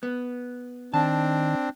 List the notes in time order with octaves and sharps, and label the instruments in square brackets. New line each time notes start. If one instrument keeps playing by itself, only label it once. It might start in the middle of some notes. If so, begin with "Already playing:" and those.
[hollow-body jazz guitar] B3
[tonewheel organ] D#3 [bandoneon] C4 D4 [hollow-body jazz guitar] A5